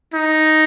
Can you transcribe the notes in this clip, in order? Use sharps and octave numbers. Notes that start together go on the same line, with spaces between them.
D#4